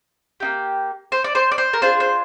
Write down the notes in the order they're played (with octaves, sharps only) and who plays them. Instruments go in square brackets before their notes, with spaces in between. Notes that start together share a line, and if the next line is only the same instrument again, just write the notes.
[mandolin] A#3 D#4 G4
C5
D5
C5
D5
C5
A#4
D4 F4 G#4 C5
C5